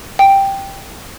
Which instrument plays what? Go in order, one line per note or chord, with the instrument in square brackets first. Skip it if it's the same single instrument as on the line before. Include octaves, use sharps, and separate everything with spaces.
[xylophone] G5